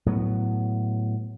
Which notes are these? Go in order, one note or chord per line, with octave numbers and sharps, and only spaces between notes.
A2 F#3 B3